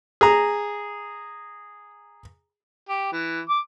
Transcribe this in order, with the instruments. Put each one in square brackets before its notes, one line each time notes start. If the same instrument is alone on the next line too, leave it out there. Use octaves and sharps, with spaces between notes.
[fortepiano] G#4 A#5
[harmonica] G4
E3
D6